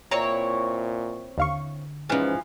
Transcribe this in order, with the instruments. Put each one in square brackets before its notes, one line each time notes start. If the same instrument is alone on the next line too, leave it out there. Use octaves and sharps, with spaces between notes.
[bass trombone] A#2 [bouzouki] C4 E4 C#5 [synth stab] A#5
[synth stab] D#2 F5 C#6 [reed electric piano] D3
[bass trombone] G#2 [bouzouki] E3 F3 [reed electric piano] C#4 B4 F6